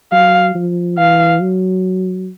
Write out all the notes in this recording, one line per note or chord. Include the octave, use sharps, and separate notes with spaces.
F#3 F5
F3
E3 F5
F#3